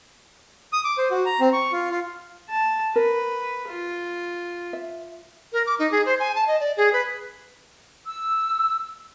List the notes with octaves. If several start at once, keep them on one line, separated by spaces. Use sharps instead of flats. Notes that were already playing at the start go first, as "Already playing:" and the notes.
D#6
D6
C5
F#4
A#5
C4
C#6
F4
F4
A5
A#4 B4
F4
E5
A#4
D6
D#4
G#4
C5
G#5
A5
D#5
D5
G#4
B4
E6